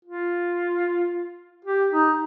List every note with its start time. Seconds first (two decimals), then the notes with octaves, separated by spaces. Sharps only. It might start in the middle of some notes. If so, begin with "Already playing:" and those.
0.05 F4
1.65 G4
1.91 D#4